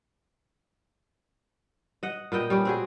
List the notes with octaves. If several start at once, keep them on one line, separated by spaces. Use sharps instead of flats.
D#5 F#5
A#2 B3 D#5 G5
G3 C#4 G4
C4 F#4 G#4